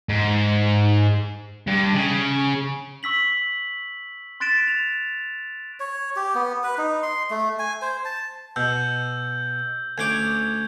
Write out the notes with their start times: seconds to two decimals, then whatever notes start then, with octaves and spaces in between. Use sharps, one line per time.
0.09 G#2
1.67 G2
1.95 C#3
3.03 C#6 E6 B6 F#7
4.40 C6 F#6 A6 B6 D7 E7
4.68 F7
5.80 C#5
6.16 G4
6.35 B3
6.64 B4
6.78 D#4
7.03 C6
7.31 A3
7.59 G#5
7.82 C5
8.05 A5
8.56 B2 E6 G6
9.98 D2 C#4 D6 G6 G#6